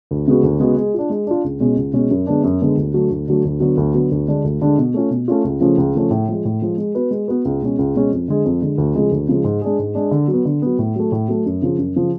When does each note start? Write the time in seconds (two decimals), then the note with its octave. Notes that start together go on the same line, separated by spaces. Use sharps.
0.11 D2
0.27 C#3 G#3 B3 F#4
0.43 D2
0.60 C#3 G#3 B3 F#4
0.77 G#3
0.94 D4 F4
1.10 G#3
1.27 D4 F4
1.44 C#2
1.60 B2 G#3 C#4
1.77 C#2
1.93 B2 G#3 C#4
2.11 F#2
2.27 D3 G#3 B3 D4
2.44 F#2
2.61 D3 G#3 B3 D4
2.77 D2
2.93 D3 F#3 A3
3.11 D2
3.28 D3 F#3 A3
3.45 D2
3.60 D3 F#3 B3
3.77 D2
3.94 D3 F#3 B3
4.11 D2
4.28 D3 G#3 D4
4.44 D2
4.62 D3 G#3 D4
4.78 B2
4.94 A3 C#4 F4
5.11 B2
5.28 A3 C#4 F4
5.44 C#2
5.60 C#3 F3 A3 C#4
5.78 C#2
5.95 C#3 F3 A3 C#4
6.11 A2
6.28 F3 G#3
6.45 A2
6.62 F3 G#3
6.78 G#3
6.95 B3 F#4 B4
7.11 G#3
7.28 B3 F#4 B4
7.45 C#2
7.62 B2 G#3 C#4
7.79 C#2
7.95 B2 G#3 C#4
8.11 F2
8.28 D3 G#3
8.45 F2
8.61 D3 G#3
8.78 D2
8.95 C#3 F3 G#3
9.12 D2
9.29 C#3 F3 G#3
9.44 G#2
9.62 G#3 D4 G#4
9.79 G#2
9.95 G#3 D4 G#4
10.11 D3
10.28 F#3
10.33 B3
10.45 D3
10.62 F#3 B3
10.79 A2
10.96 F#3 A3
11.12 A2
11.28 F#3 A3
11.46 F#2
11.62 C#3 F3
11.78 F#2
11.96 C#3 F3